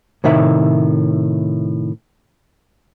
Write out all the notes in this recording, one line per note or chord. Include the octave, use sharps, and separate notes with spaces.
A2 C3 D#3 E5